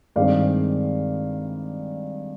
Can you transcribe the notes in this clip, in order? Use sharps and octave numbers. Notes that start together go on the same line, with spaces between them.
G2 D#3 G#3 C4 D5 F5